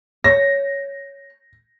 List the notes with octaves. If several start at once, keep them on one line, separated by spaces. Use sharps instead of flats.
C#5 A#6